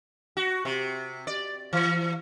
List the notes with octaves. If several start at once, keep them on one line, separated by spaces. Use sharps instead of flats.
F#4
C3
D5
E3